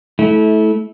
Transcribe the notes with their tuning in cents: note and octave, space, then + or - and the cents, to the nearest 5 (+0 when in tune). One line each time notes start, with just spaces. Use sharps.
A3 -20 E4 -25